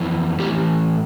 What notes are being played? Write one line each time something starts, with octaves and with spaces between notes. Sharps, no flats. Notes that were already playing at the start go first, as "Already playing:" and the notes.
Already playing: F2 E3
A2 E3 G4